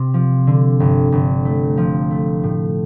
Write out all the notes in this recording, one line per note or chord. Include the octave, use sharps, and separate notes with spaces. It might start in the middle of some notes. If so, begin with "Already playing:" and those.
Already playing: C3
F3
D3
G1
G1
A3
F3
A3
A2